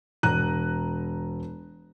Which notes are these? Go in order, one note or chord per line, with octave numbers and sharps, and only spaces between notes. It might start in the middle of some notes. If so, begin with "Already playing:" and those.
E1 A#5 F#6 D#7